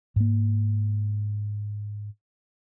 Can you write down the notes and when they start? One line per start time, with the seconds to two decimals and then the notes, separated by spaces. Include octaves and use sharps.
0.16 G#2 A#3